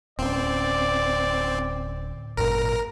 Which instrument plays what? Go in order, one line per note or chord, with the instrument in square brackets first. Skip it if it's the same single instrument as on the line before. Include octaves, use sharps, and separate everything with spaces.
[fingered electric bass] D1 C#4 [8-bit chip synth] C4 [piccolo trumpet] D5
[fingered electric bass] G#1 F#2 A#2 [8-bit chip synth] A#4